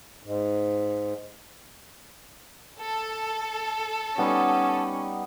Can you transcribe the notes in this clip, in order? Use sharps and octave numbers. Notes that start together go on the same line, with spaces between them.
G#2
A4
G3 B3 C#4 D#4